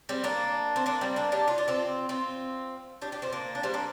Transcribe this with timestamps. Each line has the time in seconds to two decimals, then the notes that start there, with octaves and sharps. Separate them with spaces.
0.09 G3 C4
0.24 A#3 D4
0.76 C4
0.86 A#3 D4
1.01 G3 C4
1.16 A#3 D4
1.32 D4 G4
1.48 F4
1.58 D4
1.68 C4 F4
2.09 C4 F4
3.02 D4 G4
3.12 D4 G4
3.22 C4 F4
3.33 A#3 D4
3.55 D4
3.63 G3 C4
3.74 A#3 D4